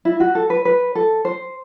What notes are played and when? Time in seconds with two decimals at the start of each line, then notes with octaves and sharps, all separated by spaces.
0.05 E4
0.20 F#4
0.35 A4
0.50 B4
0.65 B4
0.95 A4
1.25 C5